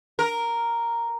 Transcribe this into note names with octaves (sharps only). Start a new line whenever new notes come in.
A#4